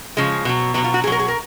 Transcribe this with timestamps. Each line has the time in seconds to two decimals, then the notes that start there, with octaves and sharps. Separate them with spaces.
0.17 C#3 F3 G#3
0.45 B2 F#3
0.74 F#3 B3
0.78 B2
0.84 F4
0.94 F#4
1.04 B2 G#4
1.07 F#3 A#4
1.19 G#4
1.28 A#4